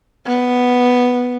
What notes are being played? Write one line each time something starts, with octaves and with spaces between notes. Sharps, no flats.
B3